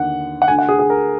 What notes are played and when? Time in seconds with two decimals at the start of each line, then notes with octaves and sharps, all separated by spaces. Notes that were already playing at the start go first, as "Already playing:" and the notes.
Already playing: D#2 D3 F#5
0.42 F#5
0.48 D2 D3 G#5
0.59 F#5
0.69 G#4
0.79 G#4
0.90 A#4